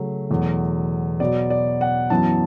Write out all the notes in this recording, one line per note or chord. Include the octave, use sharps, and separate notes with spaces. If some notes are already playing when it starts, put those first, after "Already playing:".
Already playing: C#3 F#3 A3
E2 B2 F#3 A3
B2 F#3 B3 D5
D5
F#5
F#2 E3 B3 A5